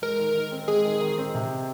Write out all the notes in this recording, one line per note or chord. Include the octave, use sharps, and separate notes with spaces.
G#3 A#4
D#3
D#3
C4
G#3 G#4
D#3
D#3
C4
C3